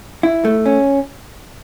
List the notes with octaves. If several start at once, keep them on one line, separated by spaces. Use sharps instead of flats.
E4
A3
C#4